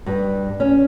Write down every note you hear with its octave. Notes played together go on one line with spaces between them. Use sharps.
G2
C#4